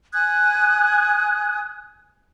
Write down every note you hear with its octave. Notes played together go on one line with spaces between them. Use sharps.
G#5 D#6 F#6 G#6